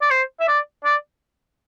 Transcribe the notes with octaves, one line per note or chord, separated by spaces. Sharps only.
D5
C5
E5
D5
D5